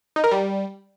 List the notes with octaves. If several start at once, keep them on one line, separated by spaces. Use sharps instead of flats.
D#4
A#4
G3